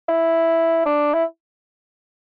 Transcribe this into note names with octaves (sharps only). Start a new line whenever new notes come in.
E4
D4
E4